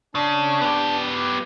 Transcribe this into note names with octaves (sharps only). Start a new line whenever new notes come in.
C#3 D4
B3 G4